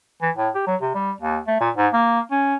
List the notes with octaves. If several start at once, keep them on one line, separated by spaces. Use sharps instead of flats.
E3
A2
G4
F#3
C3
G3
D#2
A3
A#2
G#2
A#3
C#4